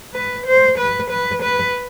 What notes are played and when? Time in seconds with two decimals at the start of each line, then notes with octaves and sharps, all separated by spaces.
0.14 B4
0.47 C5
0.78 B4
1.10 B4
1.42 B4